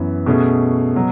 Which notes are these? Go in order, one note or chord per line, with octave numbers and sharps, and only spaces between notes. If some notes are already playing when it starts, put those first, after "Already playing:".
Already playing: F#2 E3 B3
B2 A3 C#4 G#4
B2 F#3